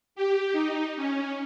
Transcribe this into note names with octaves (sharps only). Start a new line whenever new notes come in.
G4
D#4
C#4